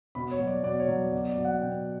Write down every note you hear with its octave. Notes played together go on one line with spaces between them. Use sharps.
B2 B5
C#5
F#3
D5
B2 D5
C#5
F#3
D5
B2 D5
D5
F#3
F#5
B2 G5